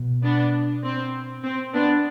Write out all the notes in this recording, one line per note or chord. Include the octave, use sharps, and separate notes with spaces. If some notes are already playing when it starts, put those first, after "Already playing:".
Already playing: B2
B3 D4
C4
C4
B3 D4